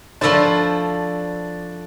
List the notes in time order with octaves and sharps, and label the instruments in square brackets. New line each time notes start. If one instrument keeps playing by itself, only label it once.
[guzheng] F3 A3 E4 A4 C5 [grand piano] D4 D5